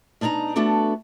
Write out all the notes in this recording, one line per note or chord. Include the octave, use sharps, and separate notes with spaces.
B2 D4 D#4 A5 A#5
A3 B3 D4 F#4 A4